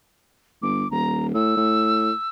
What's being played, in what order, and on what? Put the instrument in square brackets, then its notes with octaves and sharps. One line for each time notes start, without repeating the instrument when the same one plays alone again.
[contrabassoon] G1 [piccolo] D6
[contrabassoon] D#1 [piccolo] A#5
[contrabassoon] A2 [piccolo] E6
[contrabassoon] A2